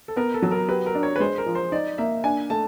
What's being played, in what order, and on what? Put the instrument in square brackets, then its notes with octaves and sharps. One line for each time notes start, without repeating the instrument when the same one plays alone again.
[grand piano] A4
[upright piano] B3 [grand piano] A#4
[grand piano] A4
[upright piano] F#3
[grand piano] A#4
[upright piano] G4 [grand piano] B4
[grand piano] A#4
[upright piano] D4
[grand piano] C#5
B4
[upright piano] G#3 [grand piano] C5
[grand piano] A#4
[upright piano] F3
[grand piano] C5
[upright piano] D#4 [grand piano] D5
[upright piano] A#3 [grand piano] E5
[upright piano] D4 [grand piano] G#5
[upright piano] A3 [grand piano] A5